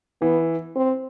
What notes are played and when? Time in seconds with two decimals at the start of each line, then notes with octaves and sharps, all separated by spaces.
0.22 E3 B3
0.75 C4